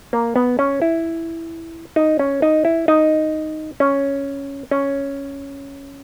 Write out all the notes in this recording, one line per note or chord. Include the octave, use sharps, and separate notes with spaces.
A#3
B3
C#4
E4
D#4
C#4
D#4
E4
D#4
C#4
C#4